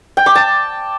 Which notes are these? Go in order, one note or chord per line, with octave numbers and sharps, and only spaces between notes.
G5
D6
A5